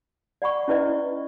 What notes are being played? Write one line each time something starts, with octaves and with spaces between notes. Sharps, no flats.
D5 F#5 B5 C#6
C#4 E4 B4 D5 D#5